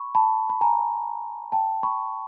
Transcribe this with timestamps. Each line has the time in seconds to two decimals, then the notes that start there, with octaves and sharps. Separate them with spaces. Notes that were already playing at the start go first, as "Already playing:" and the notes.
Already playing: B5 C#6
0.15 A5 B5
0.50 B5
0.61 G#5 A#5
1.52 G5 A5
1.83 B5 C#6